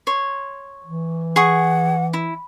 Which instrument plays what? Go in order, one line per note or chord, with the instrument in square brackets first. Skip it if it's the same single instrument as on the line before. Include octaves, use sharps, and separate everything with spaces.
[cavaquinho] C#5 C6
[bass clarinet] E3
[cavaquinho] G#4 C#6 [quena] F#5
[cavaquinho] E4